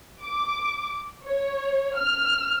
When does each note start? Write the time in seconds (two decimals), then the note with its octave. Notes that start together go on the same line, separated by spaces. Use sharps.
0.23 D6
1.26 C#5
1.97 F6